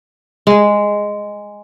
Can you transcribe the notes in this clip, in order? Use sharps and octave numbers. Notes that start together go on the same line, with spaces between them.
G#3